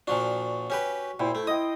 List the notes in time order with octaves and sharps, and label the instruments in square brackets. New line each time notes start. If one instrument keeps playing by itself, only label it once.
[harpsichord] A#2 F3 D4 [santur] F#4
[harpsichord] C#4 G4 B4
[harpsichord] A#2 [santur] E4 C5 G5
[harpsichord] A3
[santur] D#5 G5 [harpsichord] D#6